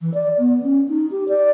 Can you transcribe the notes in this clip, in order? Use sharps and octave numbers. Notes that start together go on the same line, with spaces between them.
E3
D5
B3
C#4
D#4
G4
D5